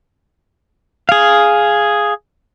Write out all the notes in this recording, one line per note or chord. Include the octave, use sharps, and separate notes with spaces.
G#4 F5